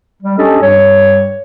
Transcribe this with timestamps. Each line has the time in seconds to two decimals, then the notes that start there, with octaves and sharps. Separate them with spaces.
0.23 G3
0.38 C#4 D4 G4 A4 D#5
0.62 G2 G3 C#5